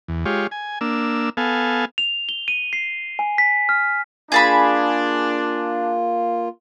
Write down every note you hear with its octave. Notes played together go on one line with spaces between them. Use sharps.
E2
G#3 F4 G4 C#5
G#5
A#3 D4 E6
B3 A4 F5 G#5
F7
G7
D#7
C7
G#5
B6
F6
A#3 D4 F4 G#4 A5 B5